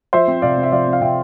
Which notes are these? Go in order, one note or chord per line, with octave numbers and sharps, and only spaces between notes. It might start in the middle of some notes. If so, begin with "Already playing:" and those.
F3 C5 E5
C4
C3 D5 F5
C3
E5
F3 D5 F5
C4
F5
C3 E5 G5